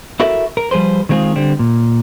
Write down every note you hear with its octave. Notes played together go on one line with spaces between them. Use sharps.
E4 F#4 A4 A#4 E5
A#4
F3 G3 G#4 B4 C5
D#3 G#3 C4 F4 G#4
D3 G3 C4
A#2